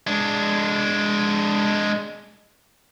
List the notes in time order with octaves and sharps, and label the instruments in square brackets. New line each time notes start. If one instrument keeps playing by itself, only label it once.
[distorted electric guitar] G#3 D4